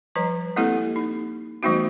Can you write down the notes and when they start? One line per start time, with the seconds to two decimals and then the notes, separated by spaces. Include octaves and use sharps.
0.15 F3 G3 B4 A#5
0.56 G#3 A#3 C4 E4 G4 A4
0.96 D#4
1.63 E3 G3 A3 B3 D#4 F#4